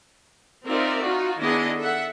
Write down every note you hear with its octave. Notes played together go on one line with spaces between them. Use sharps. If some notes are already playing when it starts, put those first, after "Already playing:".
C4 D#4 F4 A#4 D5 E5
D#4 F4 F#4
D#3 B3 D4 E4 G#4 D#5
A4 E5 F#5